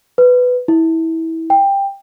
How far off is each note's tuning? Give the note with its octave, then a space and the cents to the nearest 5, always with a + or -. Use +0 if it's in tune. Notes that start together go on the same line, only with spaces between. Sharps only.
B4 +10
E4 -25
G5 +15